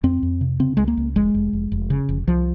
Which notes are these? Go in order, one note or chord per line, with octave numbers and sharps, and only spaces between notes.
F2 C4
F2
C3
C#3 C4
C#2 G#3
A#3
C#2
F1 G#3
F1
F1
F1
C#3
F1
C2 F3